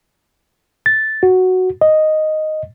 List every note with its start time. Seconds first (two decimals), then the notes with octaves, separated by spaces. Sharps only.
0.86 A6
1.23 F#4
1.81 D#5